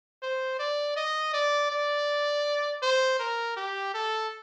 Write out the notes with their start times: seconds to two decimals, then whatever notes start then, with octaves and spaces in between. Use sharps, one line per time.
0.23 C5
0.59 D5
0.96 D#5
1.34 D5
1.71 D5
2.83 C5
3.19 A#4
3.57 G4
3.94 A4